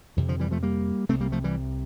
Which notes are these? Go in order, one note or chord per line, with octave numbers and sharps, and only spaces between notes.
F2 C3 E3
D3 F3
E3 G3
F3 A3
G3 A#3
C2 C3 A3 C4
G3 A#3
F3 A3
E3 G3